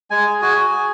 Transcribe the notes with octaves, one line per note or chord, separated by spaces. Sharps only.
G#3 G#5
G#4
F#4 G#5
F#4
G#4